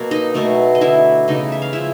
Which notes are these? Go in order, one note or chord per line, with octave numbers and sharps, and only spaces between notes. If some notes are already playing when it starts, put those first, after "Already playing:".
Already playing: B2 F#3 A#3
D#4 D#5
B2 F#3 A3
D#5
D3 F#3 B3 E4 E5
C#3 E3 A3 D#4 D#5
E5
F5
C#3 F3 G#3 E4 E5